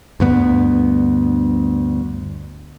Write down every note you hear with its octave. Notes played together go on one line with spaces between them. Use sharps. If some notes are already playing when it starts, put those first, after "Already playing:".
D2 G2 B3